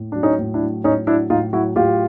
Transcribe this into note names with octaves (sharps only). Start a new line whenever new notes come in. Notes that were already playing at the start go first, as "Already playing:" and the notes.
Already playing: A2
F#3 D4
C#4 D#4
A2
D4 E4
F#3
A2 C#4 D#4
F#3 D4 E4
A2 D#4 F4
F#3 E4 F#4
A2 F4 G4